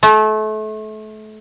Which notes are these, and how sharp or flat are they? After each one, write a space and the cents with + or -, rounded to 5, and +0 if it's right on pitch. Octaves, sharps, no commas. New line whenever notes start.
A3 -30